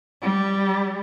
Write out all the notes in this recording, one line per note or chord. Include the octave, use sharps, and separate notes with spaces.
G3